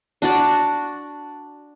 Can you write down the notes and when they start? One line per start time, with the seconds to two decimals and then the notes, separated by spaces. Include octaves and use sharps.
0.22 D4 F#4 D5